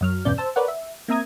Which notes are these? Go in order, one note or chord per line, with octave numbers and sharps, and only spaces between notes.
F#2 F#3 F6
E2 G2 B2 C#4 D5 G6
C5 A5 E6
A#4 B4 C#5 D5 F#5
E5
A#3 C4 E5 A#5 D#6 G#6